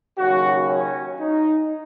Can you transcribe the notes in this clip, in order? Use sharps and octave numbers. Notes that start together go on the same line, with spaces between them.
D#2 C#3 F#3 F#4
C#4
D#4